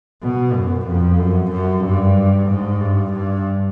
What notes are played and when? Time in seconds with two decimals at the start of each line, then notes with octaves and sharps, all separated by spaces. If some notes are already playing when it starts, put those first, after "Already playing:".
0.23 B2
0.55 F#2
0.87 F2
1.19 F#2
1.52 F#2
1.84 G2
2.49 G#2
2.81 G2
3.13 G2